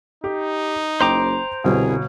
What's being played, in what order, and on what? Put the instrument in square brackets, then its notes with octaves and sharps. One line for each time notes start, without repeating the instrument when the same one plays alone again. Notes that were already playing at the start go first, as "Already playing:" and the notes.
[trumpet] D#4 [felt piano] G4
[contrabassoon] F#1 [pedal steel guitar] C5 A#5 D6 [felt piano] G5 G6
[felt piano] G1 B2 [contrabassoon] C2 [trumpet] G#4